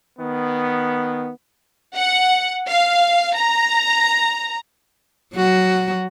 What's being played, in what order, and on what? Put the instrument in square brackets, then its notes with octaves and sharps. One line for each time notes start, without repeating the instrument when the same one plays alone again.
[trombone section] D#3 B3
[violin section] F#5
F5
A#5
[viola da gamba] F#3 F#4